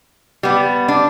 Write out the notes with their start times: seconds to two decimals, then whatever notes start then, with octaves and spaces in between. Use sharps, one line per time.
0.43 G3 B3
0.88 D4